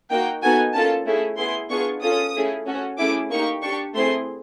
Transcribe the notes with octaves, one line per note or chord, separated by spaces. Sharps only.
A#3 D#4 F#4 G5
B3 D#4 F#4 A4 G#5
A#3 C#4 F4 A4 A5
A3 C#4 E4 G#4
B3 E4 G#4 C6
B3 D4 F4 G#4 C#6
C#4 F4 A4 D#6
A3 C#4 E4 G#4
C#4 F#4 A4
A3 C#4 E4 G#4 D6
A#3 D#4 G4 C#6
D4 G4 C#6
A3 C4 E4 G#4 C6